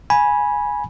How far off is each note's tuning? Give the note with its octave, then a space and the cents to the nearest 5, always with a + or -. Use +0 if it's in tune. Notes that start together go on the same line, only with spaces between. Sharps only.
G#5 +0 B5 -20